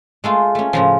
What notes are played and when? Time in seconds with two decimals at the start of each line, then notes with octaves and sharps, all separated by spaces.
0.24 G#3 A3 F4
0.55 A3 C#4
0.73 A2 C#3 F3